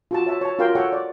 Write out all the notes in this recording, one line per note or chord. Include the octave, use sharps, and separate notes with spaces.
F4 F#4 A5
C#5 E5 A5
C#5 A5
F4 F#4 A#4 F5 G5 C6
A4 C#5 F#5 G5 C#6
D5